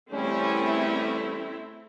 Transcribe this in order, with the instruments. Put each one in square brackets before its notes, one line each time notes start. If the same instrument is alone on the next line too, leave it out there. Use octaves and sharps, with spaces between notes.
[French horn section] E2 G3 C#4 [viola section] A3 C4 E4